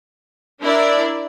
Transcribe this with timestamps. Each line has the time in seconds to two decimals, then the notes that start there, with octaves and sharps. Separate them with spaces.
0.61 D4 E4 A#4 D5